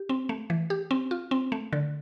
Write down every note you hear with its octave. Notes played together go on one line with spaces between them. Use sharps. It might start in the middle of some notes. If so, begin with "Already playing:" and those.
Already playing: G4
C4
A3
E3
G4
C4
F4
C4
A3
D3